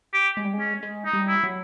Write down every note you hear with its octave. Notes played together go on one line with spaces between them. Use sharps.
G4
G#3
G3
G#3
C#4
G#3
D#4
G3
E4
F#3